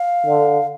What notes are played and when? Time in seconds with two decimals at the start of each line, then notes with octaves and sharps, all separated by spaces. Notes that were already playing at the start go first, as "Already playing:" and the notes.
Already playing: F5
0.26 D3